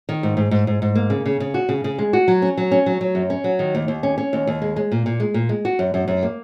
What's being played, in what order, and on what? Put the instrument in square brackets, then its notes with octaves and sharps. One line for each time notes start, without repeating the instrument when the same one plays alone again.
[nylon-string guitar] D#3
G#2
G#2
G#2
G#2
G#2
A#3
C#3
C#3
C#3
F#4
C#3
C#3
G#3
F#4
F#3
C#4
F#3
C#4
F#3
F#3
F#2
C#4
F#3
D#3
D#2
D#2
C#4
C#4
D#2
D#2
G#3
G#3
A#2
A#2
G#3
A#2
G#3
F#4
F#2
F#2
F#2
A#3